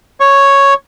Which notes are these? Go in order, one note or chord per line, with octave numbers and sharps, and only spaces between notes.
C#5 C#6